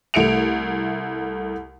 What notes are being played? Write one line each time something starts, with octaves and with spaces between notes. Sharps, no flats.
C2 A3 C#7 D7 F7